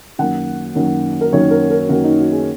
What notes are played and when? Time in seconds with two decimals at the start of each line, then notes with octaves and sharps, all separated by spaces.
0.18 F#2 D#3 F#3 A#3 F#5
0.75 F#2 D#3 F#3 A#3
1.21 A#4
1.32 F#2 D#3 F#3 A#3 C#5
1.51 A#4
1.70 A#4
1.89 F#2 D#3 F#3 A#3 F#4
2.04 D#4
2.18 F#4
2.32 G#4